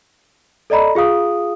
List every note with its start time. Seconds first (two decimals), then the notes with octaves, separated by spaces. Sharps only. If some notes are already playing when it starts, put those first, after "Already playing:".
0.70 A4 D5 D#5 A#5 B5
0.95 F4 G#4 F5 D#6